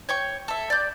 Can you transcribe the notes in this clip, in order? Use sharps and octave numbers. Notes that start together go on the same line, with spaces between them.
C#5 G5 C#6
A4 E5
D5 G6